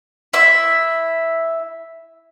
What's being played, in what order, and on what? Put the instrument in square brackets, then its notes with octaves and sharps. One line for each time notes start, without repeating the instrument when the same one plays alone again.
[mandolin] E4 E5